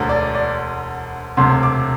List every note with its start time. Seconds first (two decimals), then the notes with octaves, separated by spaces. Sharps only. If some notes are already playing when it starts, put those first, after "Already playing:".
Already playing: E1 D2 D3
0.09 D5
0.35 D5
1.37 E1 D2 C3 C6
1.63 D6